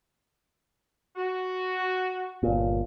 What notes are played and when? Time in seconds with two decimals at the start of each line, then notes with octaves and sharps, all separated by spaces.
1.16 F#4
2.43 G1 A#2